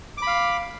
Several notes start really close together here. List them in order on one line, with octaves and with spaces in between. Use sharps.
D6 B5 F5